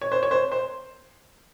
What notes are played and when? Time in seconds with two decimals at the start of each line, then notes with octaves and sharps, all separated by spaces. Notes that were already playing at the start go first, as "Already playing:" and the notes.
0.01 C#5
0.12 C5
0.23 C#5
0.31 C5
0.52 C5